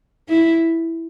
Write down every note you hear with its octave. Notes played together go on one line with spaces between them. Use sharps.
E4